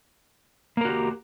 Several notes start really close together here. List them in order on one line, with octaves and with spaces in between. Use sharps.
A#3 A#4 F#4 G4